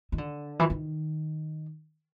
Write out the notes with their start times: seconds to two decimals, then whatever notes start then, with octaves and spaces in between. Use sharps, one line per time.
0.12 D#3
0.18 D3
0.59 E3
0.70 D#3